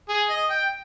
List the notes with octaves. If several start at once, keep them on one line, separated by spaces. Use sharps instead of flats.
G#4
D#5
G5